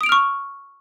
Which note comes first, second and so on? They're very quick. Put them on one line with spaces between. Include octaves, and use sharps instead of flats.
D#6 D7 F7 F6 C#6